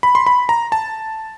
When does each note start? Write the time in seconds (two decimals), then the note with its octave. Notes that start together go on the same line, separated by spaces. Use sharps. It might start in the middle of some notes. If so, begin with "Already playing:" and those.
0.03 B5
0.15 C6
0.27 B5
0.49 A#5
0.72 A5